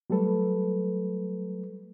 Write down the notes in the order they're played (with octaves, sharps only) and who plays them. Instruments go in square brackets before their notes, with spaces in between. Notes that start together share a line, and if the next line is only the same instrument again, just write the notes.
[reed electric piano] F#3 G3 A3 A4 B4